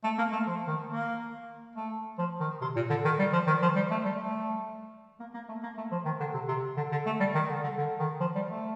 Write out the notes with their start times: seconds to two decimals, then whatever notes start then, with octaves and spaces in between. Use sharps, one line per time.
0.04 A3
0.18 A#3
0.32 A3
0.47 F3
0.68 D#3
0.90 A#3
1.76 A3
2.19 F3
2.40 D#3
2.61 C3
2.76 A#2
2.90 D3
3.05 D#3
3.19 G3
3.33 F3
3.47 D#3
3.62 F3
3.76 G3
3.91 A3
4.05 G3
4.20 A3
5.20 A#3
5.34 A#3
5.49 A3
5.63 A#3
5.77 A3
5.92 F3
6.06 D#3
6.20 D3
6.34 C3
6.48 C3
6.77 D3
6.92 D3
7.06 A3
7.20 G3
7.35 D#3
7.49 D3
7.63 D3
7.78 D3
7.99 D#3
8.21 F3
8.35 G3
8.50 A3